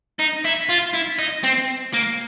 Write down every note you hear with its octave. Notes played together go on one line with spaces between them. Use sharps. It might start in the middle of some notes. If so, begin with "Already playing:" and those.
D#4
E4
F4
E4
D#4
C4
A#3